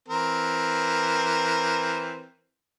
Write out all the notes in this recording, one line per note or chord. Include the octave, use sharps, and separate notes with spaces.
E3 C4 A#4